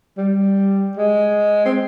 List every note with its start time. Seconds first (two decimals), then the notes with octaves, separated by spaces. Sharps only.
0.17 G3
0.97 G#3
1.66 C4